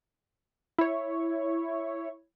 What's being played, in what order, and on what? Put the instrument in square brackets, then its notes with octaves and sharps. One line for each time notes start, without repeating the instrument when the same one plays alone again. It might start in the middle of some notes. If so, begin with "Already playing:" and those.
[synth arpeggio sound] E4 C#5